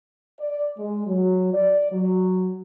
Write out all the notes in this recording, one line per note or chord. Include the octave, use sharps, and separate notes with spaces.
D5
G#3
F#3
D5
F#3